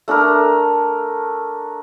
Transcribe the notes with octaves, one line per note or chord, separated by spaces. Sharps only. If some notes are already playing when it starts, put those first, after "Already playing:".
A3 D4 A4 A#4